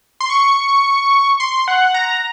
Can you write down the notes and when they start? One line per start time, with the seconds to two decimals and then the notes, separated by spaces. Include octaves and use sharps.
0.20 C6
0.30 C#6
1.40 C6
1.68 F#5
1.94 A#5